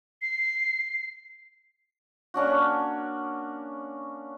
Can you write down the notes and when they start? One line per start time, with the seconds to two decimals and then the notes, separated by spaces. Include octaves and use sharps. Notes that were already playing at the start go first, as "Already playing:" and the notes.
0.22 C7
2.34 A#3 C#4 D4 F#4